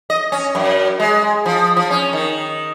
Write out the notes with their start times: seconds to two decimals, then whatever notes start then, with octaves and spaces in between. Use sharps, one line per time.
0.10 D#5
0.32 C#4
0.55 F#2
1.00 G#3
1.46 F3
1.77 F3
1.91 C#4
2.13 D#3